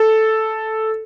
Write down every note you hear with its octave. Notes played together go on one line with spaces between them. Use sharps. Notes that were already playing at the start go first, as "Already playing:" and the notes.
Already playing: A4